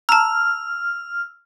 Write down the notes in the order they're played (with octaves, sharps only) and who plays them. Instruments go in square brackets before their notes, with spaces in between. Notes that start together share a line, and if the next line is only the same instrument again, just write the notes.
[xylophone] A5 A#5 [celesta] E6 [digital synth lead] F6